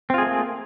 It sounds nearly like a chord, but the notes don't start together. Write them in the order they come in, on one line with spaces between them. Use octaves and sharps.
C4 F4 G#4 A3 A#3